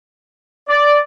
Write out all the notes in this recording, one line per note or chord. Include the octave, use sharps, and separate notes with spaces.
D5